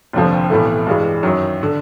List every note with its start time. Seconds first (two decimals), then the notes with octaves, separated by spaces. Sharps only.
0.13 F1 D#2 D3 F3
0.50 B1 A2 E3 A3
0.87 G2 E3 G#3
1.23 F#2 D#3 F#3
1.63 D3